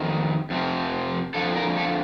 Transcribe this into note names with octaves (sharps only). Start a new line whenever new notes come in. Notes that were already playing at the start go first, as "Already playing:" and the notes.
Already playing: F2 D#3
F2 C3 F3
F2 D3 F3 A4
A#4
A4